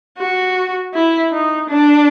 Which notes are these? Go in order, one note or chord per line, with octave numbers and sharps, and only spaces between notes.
F#4
E4
D#4
D4